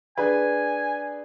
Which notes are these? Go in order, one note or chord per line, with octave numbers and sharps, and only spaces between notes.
D4 G#4 B4 G#5